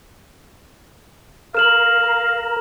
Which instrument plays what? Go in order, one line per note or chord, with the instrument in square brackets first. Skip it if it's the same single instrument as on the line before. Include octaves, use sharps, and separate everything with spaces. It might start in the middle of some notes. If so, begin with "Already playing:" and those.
[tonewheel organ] A#4 [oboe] F5 [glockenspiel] F6 E7 F#7